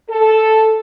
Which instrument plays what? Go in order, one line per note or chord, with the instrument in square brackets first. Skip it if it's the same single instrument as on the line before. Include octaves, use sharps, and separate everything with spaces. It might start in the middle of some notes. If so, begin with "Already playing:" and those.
[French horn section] A4